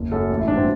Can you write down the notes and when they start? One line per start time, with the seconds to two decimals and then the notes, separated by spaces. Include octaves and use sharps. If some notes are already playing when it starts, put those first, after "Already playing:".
Already playing: F#1
0.11 F#2 F#3 A4
0.30 A1
0.39 E4
0.48 G2 F#3 D4
0.57 C4